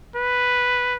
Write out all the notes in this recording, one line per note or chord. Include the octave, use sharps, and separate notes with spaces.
B4